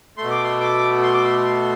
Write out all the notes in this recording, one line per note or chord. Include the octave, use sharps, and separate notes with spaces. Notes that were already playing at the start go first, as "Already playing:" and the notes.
B2 A3 C6
D6
C6
D6
C6
D6
C6